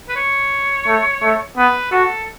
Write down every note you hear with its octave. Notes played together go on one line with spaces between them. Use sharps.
B4
C#5
A3
A3
B3 B4
F#4 A4